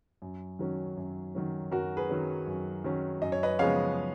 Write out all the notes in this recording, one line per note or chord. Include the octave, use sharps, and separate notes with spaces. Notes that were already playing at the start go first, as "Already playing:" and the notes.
F#2
D#3 F#3 C#4
F#2
D#3 F#3 C#4
F#2 F#4 A#4
G#4 B4
D#3 F#3 C#4
F#2
D#3 F#3 C#4
F#2 D#5
C#5
B4 D#5
C#3 F3 G#3 B3 C#5 F5